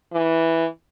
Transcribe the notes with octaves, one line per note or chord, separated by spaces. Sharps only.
E3